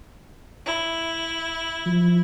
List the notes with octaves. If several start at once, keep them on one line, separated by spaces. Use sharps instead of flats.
E4
F3